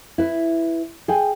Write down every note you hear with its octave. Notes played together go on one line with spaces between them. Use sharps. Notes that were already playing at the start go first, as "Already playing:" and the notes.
E4 B4
G#4 G5 G#5